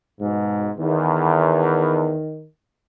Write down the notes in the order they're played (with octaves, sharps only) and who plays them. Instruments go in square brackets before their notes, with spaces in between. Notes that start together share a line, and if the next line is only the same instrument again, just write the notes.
[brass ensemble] G#2 B2
[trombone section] E2 [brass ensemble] D#3